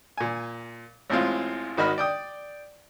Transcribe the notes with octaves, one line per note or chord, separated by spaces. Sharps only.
A#2 G#5
A1 A2 G#3 C4 F4
G#1 D#3 F#4 D#5 B5 F6
D5 G5 D#6